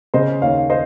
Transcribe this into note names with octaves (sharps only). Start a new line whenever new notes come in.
C#3 C5 D#5
D#2 C#5 F5
C5 D#5